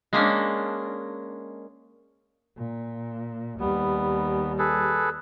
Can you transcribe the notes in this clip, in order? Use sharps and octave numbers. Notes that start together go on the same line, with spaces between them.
G#3 A#3 C#4 D4
A#2
D#2 G3 B3
G#4 A4 B4